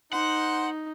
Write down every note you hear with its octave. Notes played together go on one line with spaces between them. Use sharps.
D#4 C5 F#5